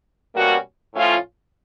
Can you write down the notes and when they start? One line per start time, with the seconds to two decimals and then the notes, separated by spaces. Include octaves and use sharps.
0.35 B2 G3 A#3 C#4 F#4
0.94 A2 F3 A3 C#4 F4